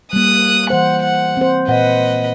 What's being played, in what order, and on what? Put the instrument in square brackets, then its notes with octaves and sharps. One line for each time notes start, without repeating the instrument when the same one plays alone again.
[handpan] G3 A#3 [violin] D#6 F#6
[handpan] E3 C5 [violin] F#5
[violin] F#5
[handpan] C4 C5
[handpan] A#2 F#5 [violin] B4 D#5